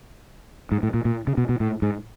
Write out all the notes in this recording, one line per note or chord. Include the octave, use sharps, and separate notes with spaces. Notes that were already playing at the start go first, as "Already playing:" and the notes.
G#2
A2
A#2
A#2
C#3
B2
B2
A2
G#2